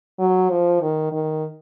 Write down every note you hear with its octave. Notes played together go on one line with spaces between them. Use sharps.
F#3
F3
D#3
D#3